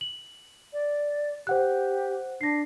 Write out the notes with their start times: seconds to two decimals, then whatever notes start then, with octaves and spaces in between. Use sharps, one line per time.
0.01 F#7
0.73 D5
1.47 G4 C5 F#5 F#6
2.41 D4 A#6 C7